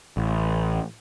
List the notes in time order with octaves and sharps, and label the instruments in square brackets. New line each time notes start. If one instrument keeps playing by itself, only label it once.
[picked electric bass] A1